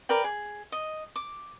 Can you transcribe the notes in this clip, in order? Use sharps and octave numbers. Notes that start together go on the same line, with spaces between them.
A#4 B4 D5 G5
G#4
D#5
D6